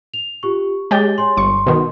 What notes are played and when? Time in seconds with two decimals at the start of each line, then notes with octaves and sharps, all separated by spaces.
0.14 F7
0.43 F4 G4 C#6
0.91 G#3 G4 C#5 A6 G7
1.18 C#5 G#5 C6
1.37 G1 C6 C#6
1.67 B2 D#3